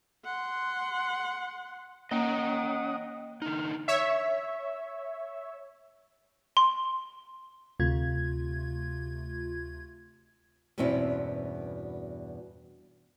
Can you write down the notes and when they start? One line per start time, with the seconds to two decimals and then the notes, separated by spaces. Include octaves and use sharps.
0.25 F#5 C6
2.11 A#3 C#4 D#5 F#5 G5 A#5 D#6
3.42 D3 D#4 F6
3.88 C#5 E5
6.57 C6
7.80 D2 C3 A3 F4 G#6
10.78 E2 G2 B2 C4 C#4 E4